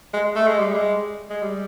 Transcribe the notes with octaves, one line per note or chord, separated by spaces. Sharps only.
G#3
A3
G#3
G3
G#3
G#3
G3